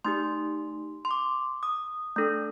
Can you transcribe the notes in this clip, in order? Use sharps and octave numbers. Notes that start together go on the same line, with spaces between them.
A3 D#4 G4 C6
C6
D6
D#6
A3 D4 A4